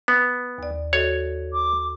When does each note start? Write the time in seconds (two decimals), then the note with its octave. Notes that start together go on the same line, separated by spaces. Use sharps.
0.08 B3
0.58 D#2 D5
0.93 F#4 A4 C#5 D#5
1.53 D6